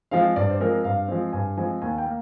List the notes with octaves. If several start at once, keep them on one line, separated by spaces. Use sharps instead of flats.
F3 G#3 C4 F5
G2 D5
C5
F3 G#3 C4 A#4
G2 F5
F3 G#3 C4
G2 G#5
F3 G#3 C4 G#5
D#2 G#5
G5
A#3